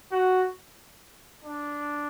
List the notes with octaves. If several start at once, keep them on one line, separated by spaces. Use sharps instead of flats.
F#4
D4